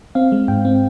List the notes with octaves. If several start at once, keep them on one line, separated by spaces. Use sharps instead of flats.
C4 F5
G#3
G#2 G5
C4